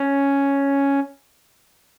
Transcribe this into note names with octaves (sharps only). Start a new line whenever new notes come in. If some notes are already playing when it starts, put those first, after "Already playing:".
Already playing: C#4